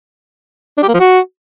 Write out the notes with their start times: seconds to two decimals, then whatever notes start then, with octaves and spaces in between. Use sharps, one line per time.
0.78 D4
0.83 G4
0.89 A#3
0.94 F3
1.00 F#4